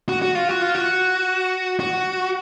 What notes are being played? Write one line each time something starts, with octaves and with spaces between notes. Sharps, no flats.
F#4
F#4
F4
F#4
F4
F#4
F#4